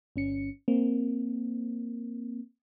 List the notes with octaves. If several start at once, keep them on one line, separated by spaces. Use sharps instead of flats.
G1 C#4 C#7
A#3 C4